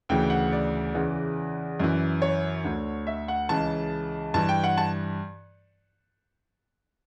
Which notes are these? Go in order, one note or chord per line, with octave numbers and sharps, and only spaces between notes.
D2 C#3 E3 G5
F#5
D5
E2 C#3 E3
F#2 E3
C#5
D2 D3
E5
F#5
C#2 C#3 E3 A5
G2 E3 A5
G5
F#5
A5